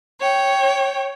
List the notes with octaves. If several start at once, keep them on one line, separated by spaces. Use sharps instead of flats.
C#5 G5